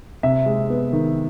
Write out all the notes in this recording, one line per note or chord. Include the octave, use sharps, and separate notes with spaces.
C3 E5
G#3
B3
D#3